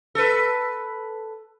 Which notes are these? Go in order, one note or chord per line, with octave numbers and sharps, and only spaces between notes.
A4 B4